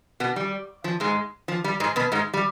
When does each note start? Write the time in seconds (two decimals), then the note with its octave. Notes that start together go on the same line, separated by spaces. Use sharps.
0.20 B2 B3
0.36 G3
0.84 F3
1.00 G#2 G#3
1.48 F3
1.64 G3
1.80 G#2 G#3
1.96 B2 B3
2.12 G#2 G#3
2.34 G3